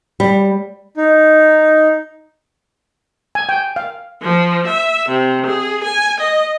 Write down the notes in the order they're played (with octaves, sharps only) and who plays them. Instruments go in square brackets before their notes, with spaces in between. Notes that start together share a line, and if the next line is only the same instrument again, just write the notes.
[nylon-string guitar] G3
[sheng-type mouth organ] D#4
[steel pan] G#5
G5
F5
[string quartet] F3
E5
C3
G#4
G#5
D#5